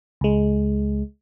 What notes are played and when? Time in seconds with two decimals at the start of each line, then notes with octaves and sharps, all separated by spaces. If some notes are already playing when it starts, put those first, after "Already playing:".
0.21 C#2 G#3